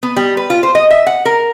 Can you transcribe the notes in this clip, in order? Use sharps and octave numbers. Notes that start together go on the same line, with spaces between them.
B3
G3
B4
F4
C5
D#5
E5
F#5
A#4